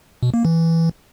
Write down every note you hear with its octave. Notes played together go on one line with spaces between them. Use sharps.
B2
A#3
E3